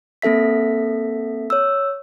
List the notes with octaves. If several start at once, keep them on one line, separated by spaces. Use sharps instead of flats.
A#3 C4 A4 E5 B6
C#5 E6